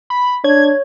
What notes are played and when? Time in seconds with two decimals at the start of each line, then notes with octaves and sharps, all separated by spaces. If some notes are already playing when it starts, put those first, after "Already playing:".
0.10 B5
0.44 D4 C#5 G#6